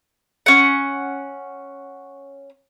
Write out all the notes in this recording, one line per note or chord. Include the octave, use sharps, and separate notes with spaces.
C#4 F#5